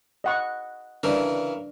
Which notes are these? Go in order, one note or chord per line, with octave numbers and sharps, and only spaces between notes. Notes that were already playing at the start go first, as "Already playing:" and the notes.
D#5 F#5 C#6
C#3 E3 D4 A#4